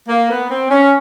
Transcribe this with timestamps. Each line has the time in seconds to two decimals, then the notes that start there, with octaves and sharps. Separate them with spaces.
0.08 A#3
0.29 B3
0.50 C4
0.70 C#4